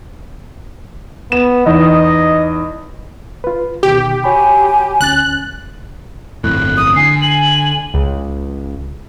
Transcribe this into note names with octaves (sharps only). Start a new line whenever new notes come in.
B3 E7
E2 D#4 D#5
F4 B4
D2 B2 D#3 G4
F#4 C#5 G#5 B5
D2 C#4 F#6 A6
G1 F2 A2 F#6
D#6
D3 G#5 C7
G#5 F#7
C#2